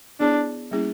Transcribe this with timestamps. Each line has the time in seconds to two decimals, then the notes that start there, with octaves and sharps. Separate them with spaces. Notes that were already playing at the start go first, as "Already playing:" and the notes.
0.20 B3 D4 E4 G#4 C#5
0.71 G3 A#3 C#4 E4 G#4